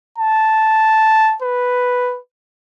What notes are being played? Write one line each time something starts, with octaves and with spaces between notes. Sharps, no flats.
A5
B4